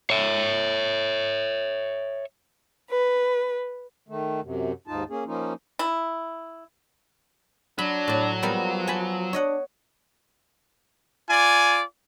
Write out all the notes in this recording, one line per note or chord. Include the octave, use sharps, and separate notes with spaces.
C#5 E5
B4
D#3 A3
F#2 C3
D#2 G#2 D#4 F4 A5
A#3 C#4 G#4
F3 A#3 C#4 D#4 F4
E4
F#3 D4 B5
A2 D5
F3 G3 A#3 B3
G#5 A5 B5
D4 C#5 D#5 F#5
F4 D5 G#5